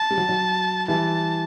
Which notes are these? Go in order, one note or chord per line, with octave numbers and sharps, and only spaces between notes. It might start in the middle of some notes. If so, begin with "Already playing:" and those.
Already playing: A5
G3
F#3
F#3
E3 G3 A5